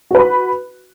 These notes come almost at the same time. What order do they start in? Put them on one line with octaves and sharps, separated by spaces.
F#4 B4 B5